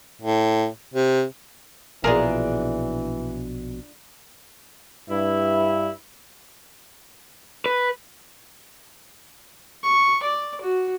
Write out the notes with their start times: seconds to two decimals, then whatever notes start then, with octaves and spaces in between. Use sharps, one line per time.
0.21 A2
0.94 C3
2.04 A#1 B2 E3 D4 F4 G#4 A#4 A#5
5.10 G2 E4
7.66 B4
9.84 C#6
10.23 D5
10.61 F#4